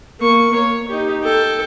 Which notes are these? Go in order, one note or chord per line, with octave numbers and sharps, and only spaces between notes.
A#3 C#6
C#5
D#4 G4
A4 G5